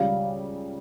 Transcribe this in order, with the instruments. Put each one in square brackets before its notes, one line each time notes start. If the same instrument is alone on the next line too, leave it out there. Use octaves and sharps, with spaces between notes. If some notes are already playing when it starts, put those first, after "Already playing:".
Already playing: [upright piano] C#2 C#3 G3 [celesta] F5